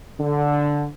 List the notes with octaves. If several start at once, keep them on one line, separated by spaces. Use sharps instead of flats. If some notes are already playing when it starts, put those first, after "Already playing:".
D3